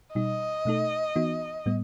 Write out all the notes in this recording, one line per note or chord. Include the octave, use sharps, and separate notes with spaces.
B2 G3 D#4 D#5
B2 A3 D#4 A4
E3 B3 D#4 F#4
A2 G3 B3